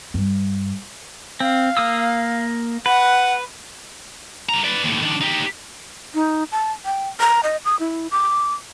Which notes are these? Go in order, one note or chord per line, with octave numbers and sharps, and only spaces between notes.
G2
C4 F5
A#3 D#6 E6
B4 F#5
G3 A#5
B4 D5
D#2 A2
D#3 D4
D#4 G4
D#4
A5
G5
A#5
D#5
D#6
E4
D6